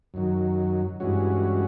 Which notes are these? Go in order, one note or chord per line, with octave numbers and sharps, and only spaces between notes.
F#2 D#3 F#3
G2 E3 G#3 C#4 F#4